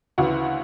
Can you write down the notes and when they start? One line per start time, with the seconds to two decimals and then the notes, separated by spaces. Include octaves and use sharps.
0.18 D2 C#3 E3 F#4